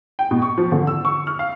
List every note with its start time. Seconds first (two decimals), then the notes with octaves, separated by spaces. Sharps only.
0.19 G5
0.31 B2
0.42 C#6
0.58 F3
0.72 D3
0.87 E6
1.05 C#6
1.27 F6
1.39 F5